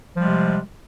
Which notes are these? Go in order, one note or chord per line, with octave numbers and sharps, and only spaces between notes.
C3 F3 G3 G#3